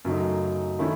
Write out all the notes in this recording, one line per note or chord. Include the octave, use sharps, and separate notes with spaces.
F#2 C#3 F#3 A3 D#4
D#3 A3 C#4 E4